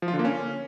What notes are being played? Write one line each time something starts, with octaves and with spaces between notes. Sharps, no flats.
F3
F4
D3
A#3
C#4